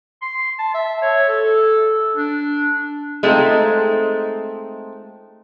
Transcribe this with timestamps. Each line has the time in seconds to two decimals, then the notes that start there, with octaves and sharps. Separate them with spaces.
0.22 C6
0.59 A5
0.74 E5
1.02 C#5
1.28 A4
2.17 D4
3.23 G#3 A3 C4 D#4 F4